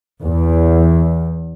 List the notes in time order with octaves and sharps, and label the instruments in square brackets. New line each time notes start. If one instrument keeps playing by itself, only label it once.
[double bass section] E2